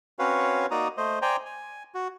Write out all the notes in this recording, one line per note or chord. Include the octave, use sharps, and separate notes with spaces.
C4 C#4 F#4 B4 C#5 F5
A#3 D#4 F#4 D5 A#5 D#6
A3 C5 D#5
C5 D5 G5 G#5 A#5
G#5
F#4